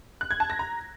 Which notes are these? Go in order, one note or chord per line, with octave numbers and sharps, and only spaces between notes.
F#6
G#6
A5
A#6
A#5